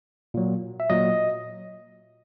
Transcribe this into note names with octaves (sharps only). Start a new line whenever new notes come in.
A#2 F#3
E5
A#2 F#3 D#5